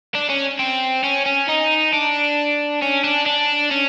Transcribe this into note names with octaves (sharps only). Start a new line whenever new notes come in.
D4
C#4
C4
C#4
C#4
D#4
D4
C#4
D4
D4
C#4